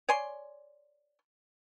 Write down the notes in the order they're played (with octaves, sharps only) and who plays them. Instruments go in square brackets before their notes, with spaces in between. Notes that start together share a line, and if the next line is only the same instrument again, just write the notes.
[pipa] C#5 D5 G#5 C6